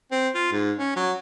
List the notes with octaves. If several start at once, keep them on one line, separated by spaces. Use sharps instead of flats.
C4
F4
G#2
C#4
F#3